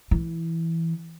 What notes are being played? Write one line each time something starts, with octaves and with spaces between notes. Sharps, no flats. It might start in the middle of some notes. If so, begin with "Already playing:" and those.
E3